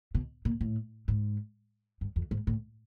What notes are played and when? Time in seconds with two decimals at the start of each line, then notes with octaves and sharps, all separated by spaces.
0.15 B2
0.45 A#2
0.61 A2
1.08 G#2
2.01 G2
2.16 F2
2.31 G#2
2.47 A2